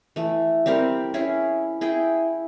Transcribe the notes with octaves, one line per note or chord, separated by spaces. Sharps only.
E3 A3
G3 C4 G4 A#4
C#4 E4 G#4
E4 G#4 G5